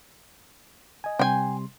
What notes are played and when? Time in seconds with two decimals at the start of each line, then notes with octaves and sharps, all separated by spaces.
1.04 D#5 G#5
1.19 C3 G3 G5 G#5 C6